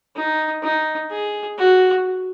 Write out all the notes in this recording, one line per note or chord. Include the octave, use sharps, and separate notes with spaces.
D#4
D#4
G#4
F#4